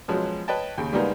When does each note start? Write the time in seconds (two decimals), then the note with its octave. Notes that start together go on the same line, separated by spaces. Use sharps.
0.08 B2 F3 F#3 G#3 C#4
0.48 B4 C#5 D#5 G5 A5
0.78 D#2 C#3
0.92 C#3 G3 G#3 A#3 B3 D#4